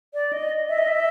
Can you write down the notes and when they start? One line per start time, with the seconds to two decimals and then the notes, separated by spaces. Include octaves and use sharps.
0.14 D5
0.33 D#5
0.69 E5
0.78 D#5
0.88 E5